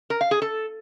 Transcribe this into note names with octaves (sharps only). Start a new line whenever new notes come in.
A#4
F5
G#4
A4